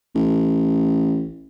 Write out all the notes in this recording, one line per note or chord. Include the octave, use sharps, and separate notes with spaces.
A1